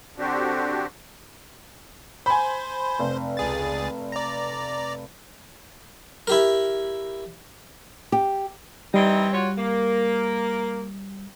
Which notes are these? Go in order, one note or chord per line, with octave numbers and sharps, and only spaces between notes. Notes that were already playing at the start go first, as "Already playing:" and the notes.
D3 C4 D4 F#4 G4
C5 G#5 B5
F1
C#2 G#4 A6
D5 A#5
E4 G4 A#4
G4
E3 G3 C4 D#4
F4 F#4 C#5
A#3